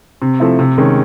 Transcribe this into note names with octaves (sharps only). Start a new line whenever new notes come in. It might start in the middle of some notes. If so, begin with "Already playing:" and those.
C3
F3 A3 C4 E4
C3
D#3 G#3 C#4